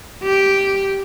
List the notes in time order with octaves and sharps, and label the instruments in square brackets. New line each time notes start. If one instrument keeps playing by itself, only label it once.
[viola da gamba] G4